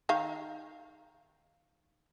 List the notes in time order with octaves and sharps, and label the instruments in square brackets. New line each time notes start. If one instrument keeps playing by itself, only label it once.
[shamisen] D#3 D#4 F5